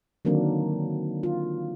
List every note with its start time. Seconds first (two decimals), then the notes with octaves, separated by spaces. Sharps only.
0.25 D3 D#3 F#3 A#3 C4 D4
1.23 F4